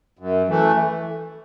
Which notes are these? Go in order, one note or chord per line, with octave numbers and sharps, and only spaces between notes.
F#2
E3 A3